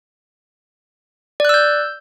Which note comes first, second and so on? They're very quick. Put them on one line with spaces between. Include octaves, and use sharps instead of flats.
D5 F#6 E6 G6